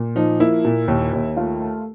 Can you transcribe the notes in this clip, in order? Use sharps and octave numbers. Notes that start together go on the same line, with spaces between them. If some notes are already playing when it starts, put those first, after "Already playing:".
Already playing: A#2
F3 D#4
A#3 E4
A#2
D#2
D#2
A3 F4
A3